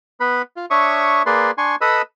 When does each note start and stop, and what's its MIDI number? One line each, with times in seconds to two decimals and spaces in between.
0.20 0.42 59
0.20 0.42 71
0.20 0.42 83
0.57 0.66 65
0.70 1.22 62
0.70 1.22 73
0.70 1.22 76
0.70 1.22 85
0.70 1.22 87
1.26 1.51 58
1.26 1.51 68
1.26 1.51 71
1.26 1.51 74
1.26 1.51 84
1.58 1.76 62
1.58 1.76 80
1.58 1.76 84
1.58 1.76 85
1.81 2.02 69
1.81 2.02 71
1.81 2.02 75
1.81 2.02 83
1.81 2.02 87
1.81 2.02 88